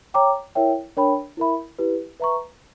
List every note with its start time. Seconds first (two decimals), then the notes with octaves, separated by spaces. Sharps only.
0.14 C#5 G5 A#5 D6
0.55 E4 A#4 C#5 E5 G5
0.97 D4 A#4 C#5 G5 B5
1.37 E4 A#4 E5 B5
1.79 E4 G4 B4
2.20 B4 E5 A#5 C#6